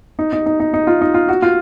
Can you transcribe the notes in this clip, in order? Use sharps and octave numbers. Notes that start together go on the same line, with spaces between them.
D#4
D#4
D#4
D#4
D#4
F4
D#4
F4
F#4
F4